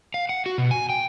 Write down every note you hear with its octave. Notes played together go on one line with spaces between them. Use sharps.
F5
F#5
F#4
B2
G#5
G5